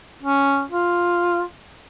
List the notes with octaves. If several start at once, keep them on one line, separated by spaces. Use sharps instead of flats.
C#4
F4